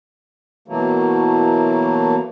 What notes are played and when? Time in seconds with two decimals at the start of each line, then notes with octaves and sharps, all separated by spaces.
0.68 B2 E3 F#3 A3 A#3